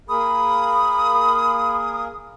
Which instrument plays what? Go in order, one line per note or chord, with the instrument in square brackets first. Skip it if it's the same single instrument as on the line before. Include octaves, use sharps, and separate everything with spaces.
[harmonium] A#3 G#4 A#4 [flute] B5 [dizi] D#6